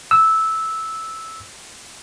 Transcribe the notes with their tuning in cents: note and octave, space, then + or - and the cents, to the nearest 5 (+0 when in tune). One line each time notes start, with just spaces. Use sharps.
E6 -10